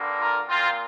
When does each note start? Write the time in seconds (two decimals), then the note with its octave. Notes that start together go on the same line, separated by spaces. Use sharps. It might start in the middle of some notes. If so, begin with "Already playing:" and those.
Already playing: G2 D3 A#3
0.20 F4 A#4
0.49 A#2 A#3 C4 F4